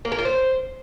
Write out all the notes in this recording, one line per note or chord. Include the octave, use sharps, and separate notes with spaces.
A#3
A#4
F4
C5